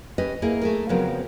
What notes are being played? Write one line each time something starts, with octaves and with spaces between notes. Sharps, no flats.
C#4 G4 B4 D#5
A#3 E4 G#4 A#4
A3 G#4 A#4
C#3 F3 F#3 B3 C4 A#4